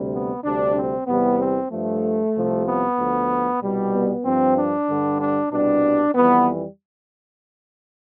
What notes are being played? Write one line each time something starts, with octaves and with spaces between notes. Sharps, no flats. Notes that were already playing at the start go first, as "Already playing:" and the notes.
Already playing: D2 C3 G3
B3
D2 C3 G3 D4
C4
E2 C3 E3 G3 B3
C4
G2 F3 A3
C2 C3 F3
B3
D2 D3 F3
C2 B2 G3
B3
G2 F3 C4
D4
G2 D3 G3
D4
C2 B2 G3 D4
F2 E3 G3 B3